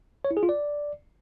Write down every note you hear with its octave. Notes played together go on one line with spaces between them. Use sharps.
C#5
E4
G#4
F4
D5